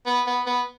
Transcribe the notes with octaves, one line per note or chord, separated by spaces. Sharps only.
B3
B3
B3